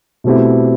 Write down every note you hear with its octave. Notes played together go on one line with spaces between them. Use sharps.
B2 A3 C4 E4 G4